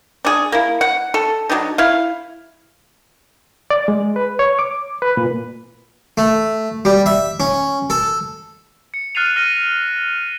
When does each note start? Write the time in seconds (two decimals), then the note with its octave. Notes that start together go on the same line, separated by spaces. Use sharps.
0.25 D4 G#4
0.52 A#3 E4
0.81 F#5
1.14 A4
1.50 F#3 G3 D4 D#4
1.78 E4 F5
3.70 D5
3.88 G#3
4.16 B4
4.39 C#5
4.59 D6
5.02 B4
5.17 A#2
6.18 A3
6.85 G3
7.06 E5
7.40 C#4
7.90 A4
8.94 C#7
9.15 F6 F#6 A6 C7 D#7 F7
9.36 F6 A#6 D#7